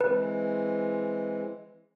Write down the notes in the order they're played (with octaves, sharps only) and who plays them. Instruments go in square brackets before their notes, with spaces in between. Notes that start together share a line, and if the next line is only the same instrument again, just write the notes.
[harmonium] E3 G#3 C4 [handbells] B4